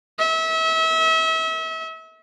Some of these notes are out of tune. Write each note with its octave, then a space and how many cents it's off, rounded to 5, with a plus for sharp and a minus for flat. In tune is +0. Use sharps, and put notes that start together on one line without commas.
E5 -35